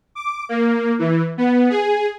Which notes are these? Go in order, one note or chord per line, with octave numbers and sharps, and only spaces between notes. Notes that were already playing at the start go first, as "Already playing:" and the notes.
D6
A#3
E3
B3
G#4